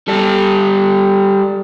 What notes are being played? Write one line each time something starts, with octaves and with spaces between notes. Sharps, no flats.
G3 A4